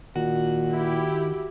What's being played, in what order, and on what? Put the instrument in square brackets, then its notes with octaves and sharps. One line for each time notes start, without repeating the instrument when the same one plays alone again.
[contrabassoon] A#2 [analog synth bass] D#3 [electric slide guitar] F#4
[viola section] E4 G4